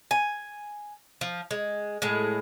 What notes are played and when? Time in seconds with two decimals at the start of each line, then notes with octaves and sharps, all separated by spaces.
0.11 G#5
1.21 F3
1.51 G#3
2.02 A2 G#3